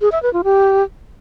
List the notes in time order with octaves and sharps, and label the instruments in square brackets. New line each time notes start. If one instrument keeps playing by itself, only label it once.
[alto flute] G#4
E5
B4
F4
G4